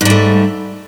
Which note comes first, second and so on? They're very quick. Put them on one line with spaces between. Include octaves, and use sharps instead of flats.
G#2 G3 A3